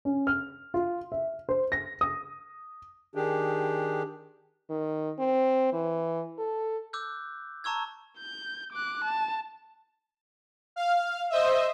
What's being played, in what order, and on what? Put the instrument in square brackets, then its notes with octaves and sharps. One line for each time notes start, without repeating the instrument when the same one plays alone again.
[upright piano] C#4
F6
F4
E5
C5
A#6
D#6
[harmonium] D#3 D4 G4 G#4
[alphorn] D#3
C4
E3
A4
[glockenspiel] D6 E6 F#6 G6
A5 A#5 C#6 E6 G#6
[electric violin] G6
D6 F#6
A5
[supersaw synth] F5
C5 D#5 E5